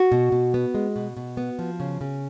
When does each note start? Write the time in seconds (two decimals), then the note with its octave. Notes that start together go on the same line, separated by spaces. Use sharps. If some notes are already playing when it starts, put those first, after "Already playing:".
Already playing: F#4
0.12 B2
0.32 B2
0.54 B3
0.75 G#3
0.96 B2
1.17 B2
1.37 B3
1.59 F3
1.80 C#3
2.01 C#3